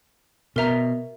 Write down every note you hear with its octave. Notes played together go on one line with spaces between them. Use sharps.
B2 A#4 E5 A#5